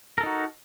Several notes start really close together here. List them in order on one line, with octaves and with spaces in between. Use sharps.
A#4 A4 D#4 F#4